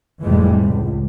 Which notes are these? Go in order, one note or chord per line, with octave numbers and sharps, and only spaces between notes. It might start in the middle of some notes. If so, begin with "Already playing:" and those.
F1 F2 A2 E3 G3 G#3
C#2